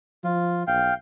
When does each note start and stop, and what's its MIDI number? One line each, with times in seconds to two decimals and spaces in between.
0.24 0.65 53
0.24 0.63 65
0.67 0.92 35
0.67 0.94 77
0.67 0.94 79